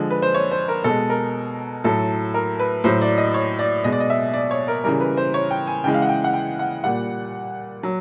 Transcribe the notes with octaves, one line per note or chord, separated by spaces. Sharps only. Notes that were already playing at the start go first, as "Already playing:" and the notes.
Already playing: D3 F3 G#3
B4
C5
C#5
C5
A#4
B2 G#3 A4
A#4
A2 F#3 A4
A#4
B4
A2 F#3 C5
D5
D#5
C#5
D5
B2 G#3 D#5
D5
D#5
E5
D5
C#5
A#4
C#3 E3 G3 A#4
B4
C5
C#5
G5
G#5
C#3 E3 G#3 G5
F5
F#5
G5
F#5
G5
F#5
A#2 G3 F#5
F#3